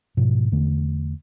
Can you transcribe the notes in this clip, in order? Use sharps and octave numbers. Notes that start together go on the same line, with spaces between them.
G#2 B2 F3
E2 D3 A3